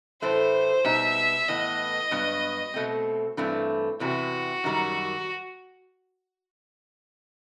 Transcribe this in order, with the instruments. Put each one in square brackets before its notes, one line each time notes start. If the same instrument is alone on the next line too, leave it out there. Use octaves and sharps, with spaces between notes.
[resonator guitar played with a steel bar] A2 E3 A3 [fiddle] C5
[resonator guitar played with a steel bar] B2 G3 B3 D#4 [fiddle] E5
[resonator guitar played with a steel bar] A2 E3 B3 [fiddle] D#5
[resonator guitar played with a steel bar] G2 F#3 B3
B2 A3 C4
G2 E3 A3 C4
[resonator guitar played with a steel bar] E2 C3 E3 [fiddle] F#4
[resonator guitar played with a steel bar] F#2 D#3 G3